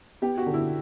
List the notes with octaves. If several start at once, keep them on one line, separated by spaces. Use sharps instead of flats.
B3 G4
F#4
D3
E4